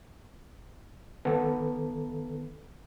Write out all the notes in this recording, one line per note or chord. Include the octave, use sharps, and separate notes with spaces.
D#3 B3 A4 B4